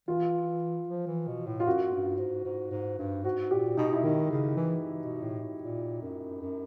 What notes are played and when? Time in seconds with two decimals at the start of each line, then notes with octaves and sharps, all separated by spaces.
0.08 E3 F4
0.88 F3
1.07 E3
1.27 B2
1.47 A2
1.60 F4
1.66 F#2 F#4
1.93 G2
2.19 G#2
2.45 G#2
2.71 G#2
2.99 G2
3.24 G#2 F#4
3.51 A#2 G4
3.77 B2 D#4
3.93 E4
4.03 D#3 D#4
4.31 C#3
4.57 E3
5.03 B2
5.22 A2
5.62 A#2
6.02 F#2
6.41 F#2